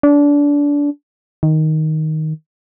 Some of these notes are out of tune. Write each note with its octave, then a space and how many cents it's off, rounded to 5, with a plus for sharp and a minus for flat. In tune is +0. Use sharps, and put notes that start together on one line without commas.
D4 -25
D#3 +5